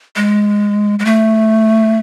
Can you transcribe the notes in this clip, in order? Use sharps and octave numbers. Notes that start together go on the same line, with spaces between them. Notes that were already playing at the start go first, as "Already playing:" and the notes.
G#3
G#3
A3